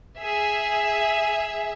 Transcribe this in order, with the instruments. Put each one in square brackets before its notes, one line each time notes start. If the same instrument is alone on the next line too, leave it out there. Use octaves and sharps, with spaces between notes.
[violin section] G#4 E5